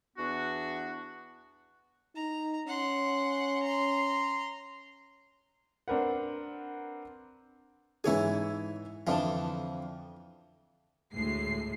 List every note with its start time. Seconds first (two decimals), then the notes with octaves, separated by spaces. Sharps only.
0.17 E2 B3 D4 F#4
2.15 D#4 A#5
2.67 C#4 F#5 C6
3.63 A#5 C6
5.88 C4 D4 A#4 B4 F#5
8.04 G#2 E3 E4 G#4 C#5 G#5
9.07 F2 D3 E3 F3 A5
11.13 D2 A2 G#3 C7